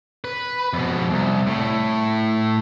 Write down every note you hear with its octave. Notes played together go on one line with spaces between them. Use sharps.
B4
F2 B2
C2
A2